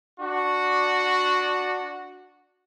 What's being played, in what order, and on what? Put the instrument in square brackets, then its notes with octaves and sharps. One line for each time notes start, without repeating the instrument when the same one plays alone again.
[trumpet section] D4 F#4